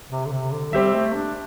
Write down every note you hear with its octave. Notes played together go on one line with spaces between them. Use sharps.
C3
D3
C3
D3
G3 C4 G4 E5
A3
D4